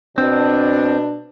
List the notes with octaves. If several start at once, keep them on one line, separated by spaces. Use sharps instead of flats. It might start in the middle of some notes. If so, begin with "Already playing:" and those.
B2 C4 D4